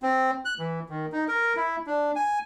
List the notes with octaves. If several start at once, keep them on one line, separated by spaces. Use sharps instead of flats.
C4
F#6
E3
D#3
D#4
A#4
E4
D4
G#5